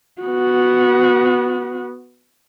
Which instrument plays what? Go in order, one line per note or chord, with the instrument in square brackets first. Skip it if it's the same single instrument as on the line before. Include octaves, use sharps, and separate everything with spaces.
[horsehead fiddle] B3 F#4